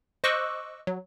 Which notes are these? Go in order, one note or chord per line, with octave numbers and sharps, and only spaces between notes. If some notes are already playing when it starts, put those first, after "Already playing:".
C5 D#5 C#6 D6 E6 F#6
F#3